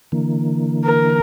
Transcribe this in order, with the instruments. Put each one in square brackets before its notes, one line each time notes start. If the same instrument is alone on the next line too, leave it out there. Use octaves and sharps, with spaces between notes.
[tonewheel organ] D3 E3 A#3
[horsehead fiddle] A#4